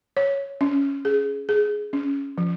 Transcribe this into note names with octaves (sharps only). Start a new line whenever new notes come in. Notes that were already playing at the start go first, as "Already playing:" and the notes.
C#5
C#4
G#4
G#4
C#4
F3